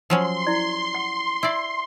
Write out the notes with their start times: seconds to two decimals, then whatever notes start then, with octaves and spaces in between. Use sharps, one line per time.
0.10 F3 F#3 C#4 C6
0.47 E4 D5
0.94 F#5
1.43 E4 D5